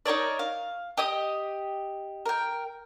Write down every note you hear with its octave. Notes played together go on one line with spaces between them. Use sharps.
D#4 A#4 C#5 D5
F5
G4 D#5 D#6
A#4 G5